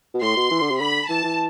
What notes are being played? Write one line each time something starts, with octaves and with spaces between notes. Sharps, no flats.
B2
A2 C6
B2
E3
D3
C3
D3 B5
E3 A5
E3